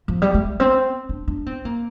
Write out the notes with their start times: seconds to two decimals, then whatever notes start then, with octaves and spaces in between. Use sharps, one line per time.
0.08 F3
0.22 G3
0.34 A3
0.60 C4
1.09 D4
1.28 D4
1.46 C4
1.65 A#3